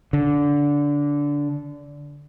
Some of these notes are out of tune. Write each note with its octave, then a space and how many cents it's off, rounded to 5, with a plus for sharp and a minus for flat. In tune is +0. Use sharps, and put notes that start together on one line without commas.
D3 -15